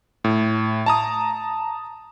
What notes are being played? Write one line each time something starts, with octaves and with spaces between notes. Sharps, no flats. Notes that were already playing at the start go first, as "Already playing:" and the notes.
A2
A5 A#5 D#6